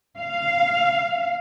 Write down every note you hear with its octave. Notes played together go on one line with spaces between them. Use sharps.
F5